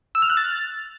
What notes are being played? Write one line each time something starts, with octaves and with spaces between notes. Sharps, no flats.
E6
F6
F#6
A6